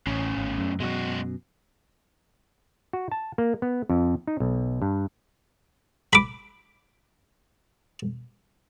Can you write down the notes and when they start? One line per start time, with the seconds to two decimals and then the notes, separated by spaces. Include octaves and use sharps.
0.07 A1 A2 C#3
0.37 G#1
0.58 F#2
0.80 F#2 B2 G#3 F#4
2.93 F#4
3.11 A5
3.38 A#3
3.62 B3
3.90 F2
4.27 D#4
4.40 B1
4.82 G2
6.13 B5 D6